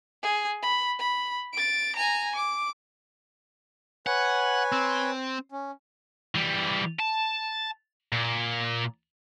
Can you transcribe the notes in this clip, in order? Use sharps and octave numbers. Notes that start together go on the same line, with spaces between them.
G#4
B5
B5
A6 D7
G#5 A#5
D6
B4 C#5 F#5 G#5
C4
C#4
E3 G3
A5
A#2